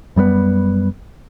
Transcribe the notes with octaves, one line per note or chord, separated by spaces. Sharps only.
F#2 G3 G#3 B3